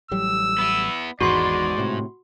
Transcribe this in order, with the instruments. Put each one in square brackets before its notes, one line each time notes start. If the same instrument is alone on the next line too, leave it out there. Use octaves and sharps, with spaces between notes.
[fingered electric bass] A1 F#3 G3 [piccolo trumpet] E6
[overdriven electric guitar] B3 E4
[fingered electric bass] G#1 E2 [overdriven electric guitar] G#2 G#3 [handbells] F#4 B5 C6 [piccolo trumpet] D5
[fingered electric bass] A2 C3